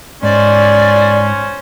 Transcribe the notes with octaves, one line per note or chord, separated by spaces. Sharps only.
G#2 C#4 C5 D5